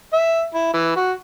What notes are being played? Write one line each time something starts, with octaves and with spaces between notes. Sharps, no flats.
E5
E4
E3
F#4